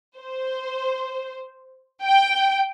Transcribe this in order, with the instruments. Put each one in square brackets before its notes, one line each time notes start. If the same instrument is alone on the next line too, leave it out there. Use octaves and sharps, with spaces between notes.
[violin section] C5
G5